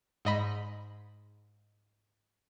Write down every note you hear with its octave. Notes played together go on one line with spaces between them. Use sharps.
G#2 D#5 B5